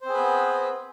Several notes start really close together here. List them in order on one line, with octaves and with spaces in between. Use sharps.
C5 C4 G#4 B4 B3